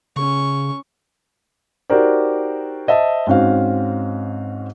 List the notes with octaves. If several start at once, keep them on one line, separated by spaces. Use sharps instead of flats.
C#3 C#4 C#6
D#4 F#4 G4 A#4 C5 D5
C5 D#5 E5 A5
G#2 C4 C#4 F#4 C5 F5